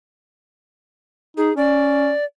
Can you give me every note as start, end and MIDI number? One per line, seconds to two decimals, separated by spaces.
1.37 1.51 63
1.37 1.53 68
1.57 2.13 61
1.57 2.24 74